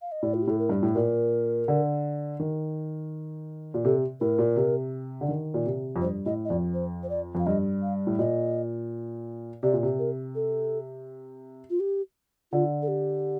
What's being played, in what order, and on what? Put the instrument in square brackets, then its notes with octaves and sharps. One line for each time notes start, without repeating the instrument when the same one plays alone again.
[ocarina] F5
D#5
[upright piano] A2 [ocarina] D5
[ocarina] F4
G4
[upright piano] A2 [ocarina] A4
[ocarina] A#4
[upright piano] G2
A2
[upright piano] A#2 [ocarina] A#4
[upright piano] D3
D#3
A#2
[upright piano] C3 [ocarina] A4
[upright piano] A2 [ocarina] A#4
[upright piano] A#2
C3
D3
D#3
A#2
C3
F2
[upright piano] G2 [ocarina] C5
[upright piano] A2 [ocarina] D#5
[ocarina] D#5
[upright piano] F2 [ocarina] D5
[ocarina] C5
C5
D5
[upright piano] F2 [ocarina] F5
[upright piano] G2 [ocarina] D#5
[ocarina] F5
[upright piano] A2
[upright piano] A#2 [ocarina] D#5
[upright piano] C3 [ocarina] D5
[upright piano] A#2
C3
[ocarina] A#4
A4
F4
G4
[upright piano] D3 [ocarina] F4
[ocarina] A4
G4